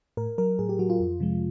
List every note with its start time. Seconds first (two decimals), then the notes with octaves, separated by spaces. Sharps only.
0.17 A2 A#4
0.38 F#3 A#4
0.59 A2 G#4
0.69 G4
0.79 F#3 F#4
0.90 F4
1.00 F2
1.20 C3 F3 G#3